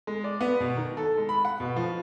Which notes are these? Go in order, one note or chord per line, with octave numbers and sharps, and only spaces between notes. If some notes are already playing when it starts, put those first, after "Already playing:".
G#3
D5
B3
B2
D#3
A4
G#3
B5
F#5
B2
F3